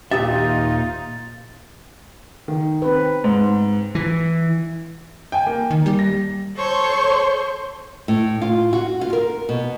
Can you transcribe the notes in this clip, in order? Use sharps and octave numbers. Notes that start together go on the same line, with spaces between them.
D#2 A#2 D#4 F4 G4 E5 D#6 A6
D#3
C4 B4
G#2
E3
G5 G#5
A#3
D#3
G3
A#6
A4 C5 C#5 C6 C#6 G6
A2
F4
F#4
F4
A#4
B2